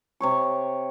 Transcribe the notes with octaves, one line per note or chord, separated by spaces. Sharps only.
C3 C#5 C#6